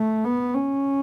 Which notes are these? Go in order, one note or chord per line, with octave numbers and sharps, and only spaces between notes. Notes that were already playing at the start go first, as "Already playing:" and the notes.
Already playing: A3
B3
C#4